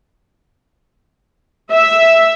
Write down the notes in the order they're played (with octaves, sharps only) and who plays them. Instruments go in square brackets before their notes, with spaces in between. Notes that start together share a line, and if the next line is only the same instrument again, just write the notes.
[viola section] E5